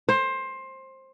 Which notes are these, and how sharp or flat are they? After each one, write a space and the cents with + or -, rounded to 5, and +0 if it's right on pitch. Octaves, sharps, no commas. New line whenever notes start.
C5 +20